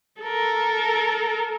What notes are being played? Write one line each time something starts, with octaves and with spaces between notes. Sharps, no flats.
A4 A#4